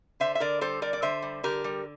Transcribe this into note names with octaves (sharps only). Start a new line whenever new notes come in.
D3 C5 E5
E5
D3 A#4 D5
G3 A4 C5
D3 A#4 D5
D5
D3 C5 E5
G3
D3 G4 A#4
G3